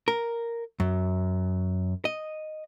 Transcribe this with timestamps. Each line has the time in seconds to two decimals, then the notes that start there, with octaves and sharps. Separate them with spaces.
0.08 A#4
0.80 F#2
2.05 D#5